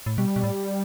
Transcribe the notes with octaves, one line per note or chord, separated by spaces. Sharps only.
A2
B2 G3
B2
A2